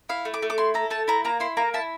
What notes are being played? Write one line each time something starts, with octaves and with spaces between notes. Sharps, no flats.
E4 F5
A3
D6
A3
D6
E4 C6
A4 A#5
A3 A5
E4 A#5
A#3 A#5
E4 C6
A#3 A#5
E4 A5